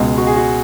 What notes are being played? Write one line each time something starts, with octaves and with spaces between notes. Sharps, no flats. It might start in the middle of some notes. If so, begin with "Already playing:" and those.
Already playing: C#2 B2 G#3
F#4
G#4
F#4